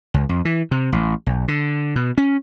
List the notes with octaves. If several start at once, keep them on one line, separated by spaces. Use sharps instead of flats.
C#2
F2
E3
C3
A1
B1
D3
B2
C#4